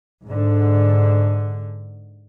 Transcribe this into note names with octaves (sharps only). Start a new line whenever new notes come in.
G#2 D3